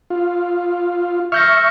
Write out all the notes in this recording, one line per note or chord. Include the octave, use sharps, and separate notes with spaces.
F4
E5 C#6 F6 G6 A#6